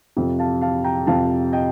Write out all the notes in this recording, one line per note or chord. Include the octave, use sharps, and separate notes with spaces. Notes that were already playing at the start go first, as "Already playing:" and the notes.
F2 C3 F3
F5 A5
F5 A5
G5 A#5
F2 C3 F3 F5 A5
D#5 G5